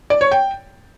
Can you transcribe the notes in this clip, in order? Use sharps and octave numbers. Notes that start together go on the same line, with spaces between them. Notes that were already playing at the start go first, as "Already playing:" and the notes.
D5
C#5
G5